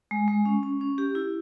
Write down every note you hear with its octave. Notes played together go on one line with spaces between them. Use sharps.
G#3
G#3
C#4
C#4
C#4
G4
E4